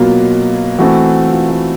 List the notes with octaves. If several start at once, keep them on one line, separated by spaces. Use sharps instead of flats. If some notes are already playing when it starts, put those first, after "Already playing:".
Already playing: B2 F#3 A#3 F4
E3 A3 C4 F#4
F4
F#4